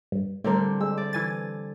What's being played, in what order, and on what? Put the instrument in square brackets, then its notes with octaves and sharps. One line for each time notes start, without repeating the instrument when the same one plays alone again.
[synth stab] G2
[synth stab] A2 A#4 [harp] D3 G3 C4
[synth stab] G#3 [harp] E6
[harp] D5
[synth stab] E3 G#5 A6